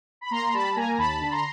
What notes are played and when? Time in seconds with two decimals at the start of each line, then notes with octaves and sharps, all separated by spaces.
0.21 B5
0.31 A#3 A#5 C6
0.53 G3 A5 B5
0.75 A#3 G#5 A#5
0.98 D#2 A5 B5
1.21 D3
1.31 A#5 C6